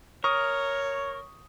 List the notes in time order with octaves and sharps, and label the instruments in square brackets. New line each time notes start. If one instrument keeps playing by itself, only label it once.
[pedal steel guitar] A#4 [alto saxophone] C#5 [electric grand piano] C#6 D#6